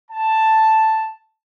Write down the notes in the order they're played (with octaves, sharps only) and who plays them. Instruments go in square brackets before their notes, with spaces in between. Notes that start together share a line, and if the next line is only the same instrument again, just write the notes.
[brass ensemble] A5